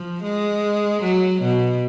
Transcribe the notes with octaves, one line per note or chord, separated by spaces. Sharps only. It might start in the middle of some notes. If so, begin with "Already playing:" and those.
Already playing: F3
G#3
F#3
B2